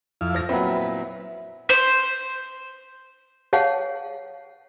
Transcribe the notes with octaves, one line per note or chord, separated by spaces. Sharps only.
F2 E4 F5
F3 A#6
A#2 F#3 B3 C4 E4 B4 A5
C5
G#4 C#5 F5 F#5 A5